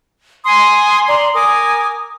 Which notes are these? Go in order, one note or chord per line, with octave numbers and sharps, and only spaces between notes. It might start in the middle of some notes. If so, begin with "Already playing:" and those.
G#5 C6 D#6
D5 A#5 C6
A#4 G#5 D6 D#6